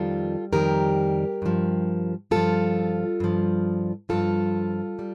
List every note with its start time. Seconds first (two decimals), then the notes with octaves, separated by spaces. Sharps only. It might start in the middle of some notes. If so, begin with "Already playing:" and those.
Already playing: F2 D#3 G3 F4 A4
0.52 F2 D#3 G3 G4 A#4
1.42 G2 F3
2.31 G2 F3 F4 A4
3.20 G2 F3
4.09 G2 F3 F4 A4
4.99 G3